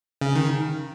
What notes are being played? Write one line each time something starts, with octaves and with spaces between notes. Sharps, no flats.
C#3
D#3